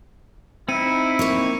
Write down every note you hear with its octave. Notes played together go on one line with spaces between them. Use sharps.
C4 D#4 E4 C#7 D#7
A#3 C#5